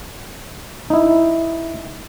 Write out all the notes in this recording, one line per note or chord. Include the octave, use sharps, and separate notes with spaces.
D#4 E4